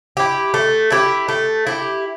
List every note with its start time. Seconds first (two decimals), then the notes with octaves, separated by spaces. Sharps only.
0.17 E4 G4
0.54 A3
0.92 E4 G4
1.28 A3
1.67 E4 G4